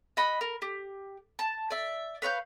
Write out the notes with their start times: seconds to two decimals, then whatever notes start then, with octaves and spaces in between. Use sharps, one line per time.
0.17 D#5 F#5 B5
0.41 A#4
0.62 G4
1.39 A5
1.70 D5 E5
2.22 B4 C#5 F5 G6